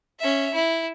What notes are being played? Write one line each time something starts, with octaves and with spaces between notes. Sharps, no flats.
C#4 E5
E4